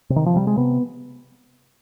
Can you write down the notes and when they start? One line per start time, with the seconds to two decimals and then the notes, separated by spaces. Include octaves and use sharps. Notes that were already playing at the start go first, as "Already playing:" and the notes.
0.10 C3
0.16 D#3
0.26 F3
0.34 C3 G3
0.47 G#3
0.57 C3 B3